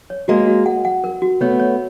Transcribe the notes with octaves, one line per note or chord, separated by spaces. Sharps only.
C#5
G#3 A#3 F#4
F#4
F#5
F#5
A#4
F#4
A3 B3 C#5
C#5